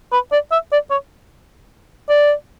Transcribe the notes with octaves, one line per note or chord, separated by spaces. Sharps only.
B4
D5
E5
D5
C#5
D5